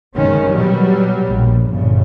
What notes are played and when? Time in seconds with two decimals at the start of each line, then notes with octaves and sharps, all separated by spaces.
0.15 F#1 D#3 G#3 C#4
0.49 B2 F#3 G3
1.26 A#1
1.69 G1 A#2 C#3